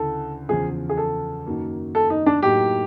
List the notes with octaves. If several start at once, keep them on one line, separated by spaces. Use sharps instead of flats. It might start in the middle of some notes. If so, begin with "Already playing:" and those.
Already playing: D2 C#3 E3 A4
E2 C#3 F3 G#4
G#4
A4
F#2 D#3 F#3 A#3
A4
D#4
D4
A2 F#3 A#3 D#4 G4